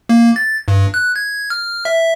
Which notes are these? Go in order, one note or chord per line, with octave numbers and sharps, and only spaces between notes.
A#3
A6
G2
F#6
G#6
F6
E5